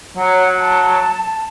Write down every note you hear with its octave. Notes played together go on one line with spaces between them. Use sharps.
F#3 C#5 F#5
A5